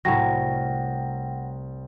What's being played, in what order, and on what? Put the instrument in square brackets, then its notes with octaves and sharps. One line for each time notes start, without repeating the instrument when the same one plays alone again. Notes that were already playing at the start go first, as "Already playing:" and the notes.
[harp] C2 [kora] A2 F#3 [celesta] F#5 G5 A#6